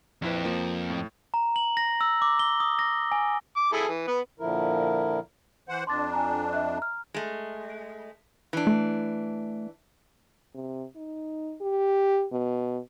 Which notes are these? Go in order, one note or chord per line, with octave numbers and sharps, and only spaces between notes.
A#1 F2 C4 E4 B4
F3 A#3
A2
A#5
F#7
A#6
E6
D6
G7
D#6
A#6
G#5
D6
E4 G#4 A4
E3
B3 B4
A#2 D3 F3 E4 A#4
E3 C5 F#5
F2 D4 C6 D6 A6
G#5 A#5
D#5 E5 F#6
A#5 F6
G#3 A3
E3 D4
A3
C3
D#4
G4
B2